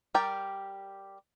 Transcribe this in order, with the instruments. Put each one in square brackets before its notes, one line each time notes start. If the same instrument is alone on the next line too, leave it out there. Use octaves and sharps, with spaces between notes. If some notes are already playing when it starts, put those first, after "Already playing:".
[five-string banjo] G3 G4 A#4 D5 G5